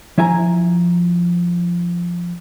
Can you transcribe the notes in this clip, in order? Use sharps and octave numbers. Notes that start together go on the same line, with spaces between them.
F3 E4 E5 G#5 A#5